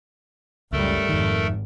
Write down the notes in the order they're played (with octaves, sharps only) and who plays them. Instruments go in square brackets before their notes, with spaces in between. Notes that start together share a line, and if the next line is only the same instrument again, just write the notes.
[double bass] F#1 G3 [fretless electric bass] C#2 [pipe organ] A3 A4 A#4
[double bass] G#1 [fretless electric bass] F2 D#3